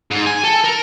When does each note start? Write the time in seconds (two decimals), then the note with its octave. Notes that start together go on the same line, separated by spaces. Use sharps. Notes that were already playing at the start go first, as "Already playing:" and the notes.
0.11 G#2
0.26 G#5
0.44 A4
0.64 A#4